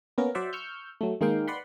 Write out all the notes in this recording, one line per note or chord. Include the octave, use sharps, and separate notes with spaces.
A#3 B3 C#4 A#4
F#3 C5 D5 E5 F#5
C#6 E6 F6 G6
F#3 A3
D#3 G#3 A#3 D#4 F5 G5
B4 D5 F#5 B5 C6